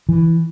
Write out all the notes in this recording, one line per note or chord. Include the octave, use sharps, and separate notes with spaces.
E3